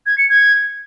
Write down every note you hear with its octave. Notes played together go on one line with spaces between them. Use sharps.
G#6
C#7
G#6